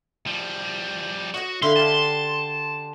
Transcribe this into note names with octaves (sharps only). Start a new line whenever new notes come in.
F3 G3
F#4 C#5 D#5 F#5
D3 E4 F5 B5 C6
G4 F5 A5